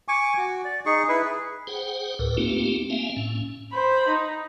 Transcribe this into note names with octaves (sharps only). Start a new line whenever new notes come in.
G#5 C#6 D6
F#4
D5
D#4 G#4 C#6
E4 B4
G#4
G#4 C5 F#5 G5
D2 A2 A#4 B4
A3 A#3 C4 D#4 F4 G4
A#3 C4 E5 F5 G#5
A2 C#4
C5 B5
D#4